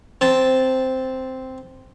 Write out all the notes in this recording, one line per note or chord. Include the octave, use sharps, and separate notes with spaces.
C4 A5